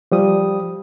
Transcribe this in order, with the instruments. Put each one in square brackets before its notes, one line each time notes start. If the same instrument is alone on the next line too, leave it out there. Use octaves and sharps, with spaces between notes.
[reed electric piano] F3 G3 D#6